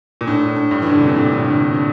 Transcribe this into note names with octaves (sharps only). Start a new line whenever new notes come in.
A#2
A2 D4
D4
G2
E3
D3 D4
C3
A#2
A2 D3
D3
D4